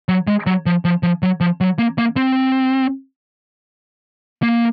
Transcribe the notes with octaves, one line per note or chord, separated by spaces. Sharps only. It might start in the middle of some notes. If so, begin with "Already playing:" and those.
F#3
G#3
F#3
F3
F3
F3
F#3
F3
F#3
A#3
A#3
C4
A#3